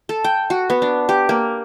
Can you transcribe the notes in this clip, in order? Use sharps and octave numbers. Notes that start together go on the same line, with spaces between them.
A4
G5
F#4
B3
D4
G4
A#3